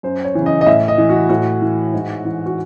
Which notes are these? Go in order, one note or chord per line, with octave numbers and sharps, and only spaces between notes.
F#2 C5
C#5
C#3 E3
D#5
D#5
A2 E5
D#5
E3
F#4
A2 F#4
E3
G#2
E3
F#4